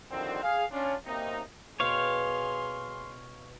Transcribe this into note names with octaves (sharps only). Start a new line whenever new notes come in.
C2 D3 D#3 F3 F#3 C4
G#4 F5
C#4 D4 F4
B1 C3 A#3 C4 D#4
B2 G#4 C5 C#5 F5 G5 C6